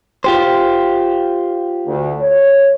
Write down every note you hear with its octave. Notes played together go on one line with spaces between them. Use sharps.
F4 G4 C5
D2
C#5